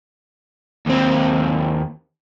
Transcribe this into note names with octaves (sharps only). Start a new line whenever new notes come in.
D#2 C4